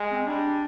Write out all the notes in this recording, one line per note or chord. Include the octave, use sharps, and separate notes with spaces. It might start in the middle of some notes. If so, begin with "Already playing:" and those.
Already playing: G#3
C4
C#4
G3 D4